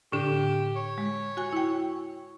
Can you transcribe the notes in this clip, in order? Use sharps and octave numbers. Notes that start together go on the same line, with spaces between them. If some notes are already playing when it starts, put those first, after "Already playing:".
A2 D3 D4 G4
C#5
G#3
F#4 G#5
E4 G5